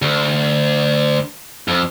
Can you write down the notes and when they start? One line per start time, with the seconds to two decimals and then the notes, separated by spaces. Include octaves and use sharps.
0.02 D2
1.68 F2